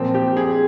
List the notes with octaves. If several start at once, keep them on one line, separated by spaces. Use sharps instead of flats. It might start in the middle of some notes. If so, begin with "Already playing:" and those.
Already playing: A#2 F3 C4
G4
G#4